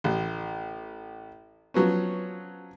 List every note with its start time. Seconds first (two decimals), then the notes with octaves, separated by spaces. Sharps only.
0.04 A1
1.74 F3 F#3 B3 C#4